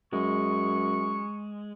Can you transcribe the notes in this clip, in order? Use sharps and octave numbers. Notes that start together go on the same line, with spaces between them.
F#2 G#3 C#6